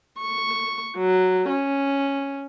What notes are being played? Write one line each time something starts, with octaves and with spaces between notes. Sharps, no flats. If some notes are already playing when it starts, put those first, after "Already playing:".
C#6
F#3
C#4